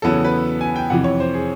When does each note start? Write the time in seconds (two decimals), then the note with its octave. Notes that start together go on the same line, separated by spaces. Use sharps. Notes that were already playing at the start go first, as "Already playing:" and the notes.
0.02 E2 C#3 F#3 B3 E4 A4
0.24 B4
0.61 G#5
0.76 G5
0.90 F2 C3 E3 F#5
1.04 C#5
1.20 C5
1.35 G#4